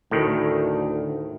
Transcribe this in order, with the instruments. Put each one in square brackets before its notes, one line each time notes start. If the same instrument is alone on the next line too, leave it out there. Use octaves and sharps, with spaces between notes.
[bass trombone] D2 [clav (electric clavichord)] A2 D#3